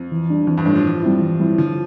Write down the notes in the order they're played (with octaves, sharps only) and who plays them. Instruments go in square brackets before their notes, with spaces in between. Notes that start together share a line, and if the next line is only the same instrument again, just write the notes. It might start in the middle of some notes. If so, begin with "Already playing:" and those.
Already playing: [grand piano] F2
[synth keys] E3
G3 D4
[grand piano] F2 [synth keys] E3
[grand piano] G2
[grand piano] A2 [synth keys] G3 D4
[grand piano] F3
[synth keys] E3
G3 C4 E4
E3
G3 C4 E4
[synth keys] D3 [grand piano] F3